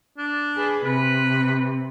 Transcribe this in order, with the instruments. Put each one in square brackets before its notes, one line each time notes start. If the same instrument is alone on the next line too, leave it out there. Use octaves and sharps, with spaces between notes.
[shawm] D4
[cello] G#4 B4
[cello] C3 [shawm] B4